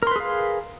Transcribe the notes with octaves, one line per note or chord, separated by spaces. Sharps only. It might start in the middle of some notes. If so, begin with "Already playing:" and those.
G#4 A#4 B4 F5 C6